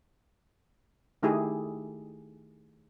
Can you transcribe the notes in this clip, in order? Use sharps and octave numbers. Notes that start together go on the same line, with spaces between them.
D#3 A3 D#4 E4 G4 G#4